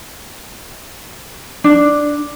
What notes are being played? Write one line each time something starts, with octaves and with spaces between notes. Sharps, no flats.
D4